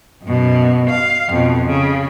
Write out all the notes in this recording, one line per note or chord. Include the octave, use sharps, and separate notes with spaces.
F#2 B2
F5
F2 B2
C#3